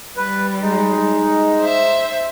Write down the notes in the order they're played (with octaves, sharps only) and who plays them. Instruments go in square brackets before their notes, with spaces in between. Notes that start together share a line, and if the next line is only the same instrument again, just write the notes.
[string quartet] G3 [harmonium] B4
[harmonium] G#3 D#4
[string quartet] C5 E5